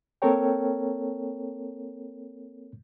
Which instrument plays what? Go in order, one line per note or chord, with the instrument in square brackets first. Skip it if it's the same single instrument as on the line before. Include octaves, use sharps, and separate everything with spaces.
[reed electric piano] A#3 C4 A4 A#4 C#5 G5